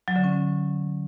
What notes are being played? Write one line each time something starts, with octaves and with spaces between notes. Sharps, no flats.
F#3
D3
C#4